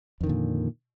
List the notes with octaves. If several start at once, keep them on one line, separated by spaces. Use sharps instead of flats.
F2 A#2 D3 D#3